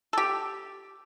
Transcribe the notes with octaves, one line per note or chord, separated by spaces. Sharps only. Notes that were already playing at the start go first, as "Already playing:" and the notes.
G4 A4